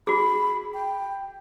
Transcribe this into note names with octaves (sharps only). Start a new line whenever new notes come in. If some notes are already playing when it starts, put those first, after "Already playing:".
F#4 G#4 B5
G5